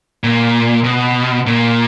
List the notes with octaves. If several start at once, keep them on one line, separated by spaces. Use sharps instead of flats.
A#2
B2
A#2